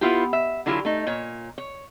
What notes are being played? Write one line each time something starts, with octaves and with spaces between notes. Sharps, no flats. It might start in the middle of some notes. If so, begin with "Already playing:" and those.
B3 E4 F4 G4
E5
D3 F#3 E4 F4 G4
A3 D#4
A#2 C#5
C#5